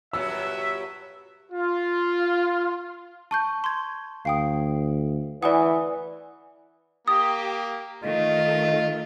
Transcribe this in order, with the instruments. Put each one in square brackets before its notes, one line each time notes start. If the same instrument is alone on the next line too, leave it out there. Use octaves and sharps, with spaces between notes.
[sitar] G2 A#2 F#3 [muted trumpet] E5 [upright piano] E6
[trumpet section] F4
[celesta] A5 C#6 G6
[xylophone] C6 G#6
[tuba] D2 [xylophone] F5 G5 D#6
[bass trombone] E3 [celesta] D5 G#5 D#6 [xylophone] F#5
[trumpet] A#3 [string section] G4 [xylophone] D#6
[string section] D#3 A3 [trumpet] F4 [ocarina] D#5